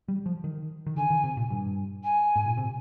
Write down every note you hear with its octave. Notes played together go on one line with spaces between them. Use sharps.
G3
F3
D#3
D#3
D3 G#5
D#3
C3
A#2
G2
G#5
G#2
A#2
C3